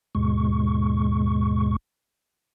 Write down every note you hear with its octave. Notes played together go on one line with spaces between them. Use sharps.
D#2 G#2 B2 G#3 C#6